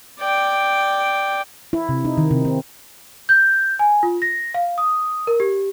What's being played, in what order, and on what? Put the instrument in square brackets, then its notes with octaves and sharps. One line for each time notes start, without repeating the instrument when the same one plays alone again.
[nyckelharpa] D5 G5
[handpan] E4
C3
D#4
D#3
C3
C4
[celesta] G6
G#5
F4
A#6
F5
D#6
A#4
G4